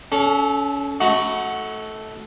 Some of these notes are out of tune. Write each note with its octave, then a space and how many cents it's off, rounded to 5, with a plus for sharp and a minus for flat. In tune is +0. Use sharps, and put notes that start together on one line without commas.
C#4 +25 A4 -20
A3 -10 D#4 +45 F#4 +0